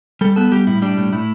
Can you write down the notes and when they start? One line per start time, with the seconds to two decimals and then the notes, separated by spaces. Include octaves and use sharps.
0.21 G3 A4
0.36 B3 A4
0.52 G3 G4
0.67 A2 E4
0.82 G3 D4
0.97 A2
1.12 A2 E4